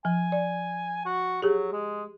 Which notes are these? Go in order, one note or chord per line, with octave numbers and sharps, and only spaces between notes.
F3 G#5
D5
F#4
F#3 G4 G#4
G#3